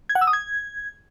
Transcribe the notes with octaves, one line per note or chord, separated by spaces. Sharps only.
G#6
F#5
E6
D#6
G#6